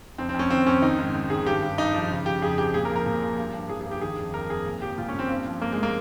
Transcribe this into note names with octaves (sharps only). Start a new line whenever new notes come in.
F2 C4
C4
F2
C#4
D#3 C4
F2 C#4
D#3 D#4
G#2
G#2
D#3 G#4
G2 G4
G2
G2 D#4
F3
C#3
F3 G4
F2 G#4
F2 G4
A#2 G#4
A#4
F3
A#4
A#2
F3
G2
G2
F3 G#4
G#4
G2
G4
D#3 G#4
F2
F2 A#4
F2 G#4
A#2
F3 G4
A#2 F4
C#4
A#2
C4
G2
F3
G2 A#3
G#3
F3
A#3